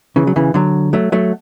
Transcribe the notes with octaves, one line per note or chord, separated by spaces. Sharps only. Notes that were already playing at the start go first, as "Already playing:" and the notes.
C#3 E3
F#3
C#3 E3
D3 F#3
F#3 A3
F#3 A3